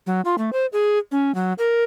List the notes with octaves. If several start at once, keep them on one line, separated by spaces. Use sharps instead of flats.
F#3
F4
A3
C5
G#4
C#4
F#3
A#4